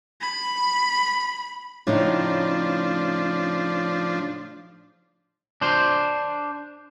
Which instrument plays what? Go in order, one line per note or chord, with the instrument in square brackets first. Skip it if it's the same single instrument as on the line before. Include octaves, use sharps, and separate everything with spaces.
[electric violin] B5
[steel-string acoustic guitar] A2 C#3 D#4 [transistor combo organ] F3 D4
[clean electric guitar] D4 C5